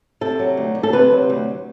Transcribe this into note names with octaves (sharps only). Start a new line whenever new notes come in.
C3 A4
F#3
D2
D2
A4
C3 B4
F#3
D2